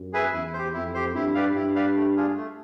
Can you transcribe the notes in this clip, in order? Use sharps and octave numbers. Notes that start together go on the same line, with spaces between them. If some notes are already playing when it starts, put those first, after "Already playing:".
Already playing: F#2
G#4 B4 E5 G#5
E2 E4
G4 C5
F2 E4
G4 C5
G2 E4
G4 B4 D5 F5
G2 E4
G4 B4 D5 F5
A3
D4 F4 G#4
A3